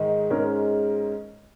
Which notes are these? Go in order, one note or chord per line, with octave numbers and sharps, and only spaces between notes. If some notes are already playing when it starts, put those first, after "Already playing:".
Already playing: G#2 D#3 G#3 D#4
G#2 G#3 C#4 A#4